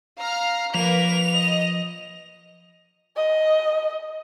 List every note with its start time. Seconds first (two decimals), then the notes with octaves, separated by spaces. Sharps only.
0.20 F5 A#5 F6
0.75 F3 A#3 A#4 B4 F7
1.34 D#5
3.16 D#5